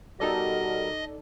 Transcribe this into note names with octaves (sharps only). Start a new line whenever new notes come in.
B2 G3 D#4 F#4 A4 A#4 D5 D#5